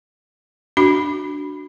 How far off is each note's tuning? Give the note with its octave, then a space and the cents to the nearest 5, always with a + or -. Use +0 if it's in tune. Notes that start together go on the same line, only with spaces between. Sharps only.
D4 +0 F#4 +0 B5 +0